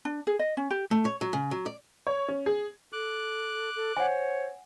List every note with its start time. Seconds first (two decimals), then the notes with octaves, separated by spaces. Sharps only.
0.05 D4
0.27 G#4
0.39 D#5
0.57 C#4
0.71 G4
0.91 A3
1.05 C#5
1.21 F#3
1.33 C#3
1.51 F#3
1.66 D5
2.07 C#5
2.28 C#4
2.46 G#4
2.93 A4 D6 F#6
3.76 A4
3.97 C5 C#5 F#5 G#5